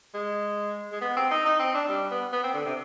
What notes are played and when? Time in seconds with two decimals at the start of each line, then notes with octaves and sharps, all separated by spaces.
0.14 G#3
0.92 G#3
1.01 B3
1.16 C4
1.31 D#4
1.45 D#4
1.59 C4
1.75 D4
1.89 G3
2.11 B3
2.33 B3
2.44 C4
2.54 D3
2.65 C3